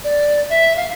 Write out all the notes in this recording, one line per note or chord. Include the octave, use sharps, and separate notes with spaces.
D5
E5
F5